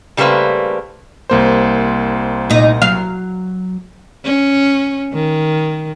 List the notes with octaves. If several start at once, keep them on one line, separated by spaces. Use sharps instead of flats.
C#3 G3 A3 A#3 B4 C5
C2 A#3 C5
A#2 D#4
F#3 F5
C#4
D#3